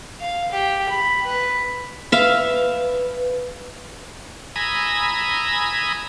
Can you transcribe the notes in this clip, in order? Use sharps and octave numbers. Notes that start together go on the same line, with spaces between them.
F5
G4
B5
B4
B4 E5 F5
G#5 A#5 B5 D#6 E6